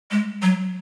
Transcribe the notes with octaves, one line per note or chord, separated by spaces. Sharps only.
G#3
F#3